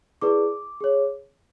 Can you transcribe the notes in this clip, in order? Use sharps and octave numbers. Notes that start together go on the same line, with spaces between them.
E4 G#4 B4 D5 D6
G#4 C#5